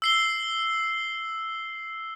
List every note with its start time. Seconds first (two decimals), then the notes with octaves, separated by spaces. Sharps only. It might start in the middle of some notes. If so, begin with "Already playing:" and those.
0.02 E6 C7 G7